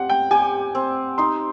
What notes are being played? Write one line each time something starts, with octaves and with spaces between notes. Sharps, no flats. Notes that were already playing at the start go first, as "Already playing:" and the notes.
Already playing: C4 G4 F#5
G5
G4 G#5
C4
D#4 C6